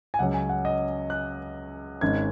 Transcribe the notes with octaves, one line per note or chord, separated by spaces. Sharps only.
G#5
C#2 C#3 F#3 C#4 F#5
G#5
F#5
D#5
F#6
G#1 G#2 G#3 C#4 G#6